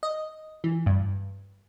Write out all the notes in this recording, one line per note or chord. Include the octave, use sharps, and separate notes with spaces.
D#5
E3
G2